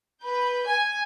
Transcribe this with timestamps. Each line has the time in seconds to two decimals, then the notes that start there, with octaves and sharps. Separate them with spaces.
0.23 B4 G6
0.67 G#5